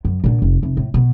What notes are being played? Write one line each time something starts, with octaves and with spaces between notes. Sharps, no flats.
F#2
A#2 D3
F1
F1
A2
B2